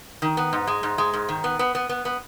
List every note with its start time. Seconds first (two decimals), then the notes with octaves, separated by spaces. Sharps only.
0.22 D#3
0.37 B3
0.53 G#2
0.67 G#3
0.83 G#2
0.98 G#3
1.13 G#2
1.29 D#3
1.44 B3
1.59 B3
1.75 B3
1.89 B3
2.05 B3